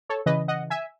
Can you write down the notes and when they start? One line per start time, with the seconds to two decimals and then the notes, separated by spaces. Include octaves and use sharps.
0.09 A4 C#5
0.26 C#3 E3 B4 D#5
0.48 D#5 F#5
0.70 E5 G#5